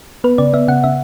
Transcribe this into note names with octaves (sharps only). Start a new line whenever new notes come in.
B3 B4
C#3 D5
B3 E5
C#3 F#5
C#3 E5